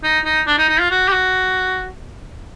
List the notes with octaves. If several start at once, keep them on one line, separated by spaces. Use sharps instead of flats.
D#4
D#4
D4
D#4
D#4
F4
F#4
G4
F#4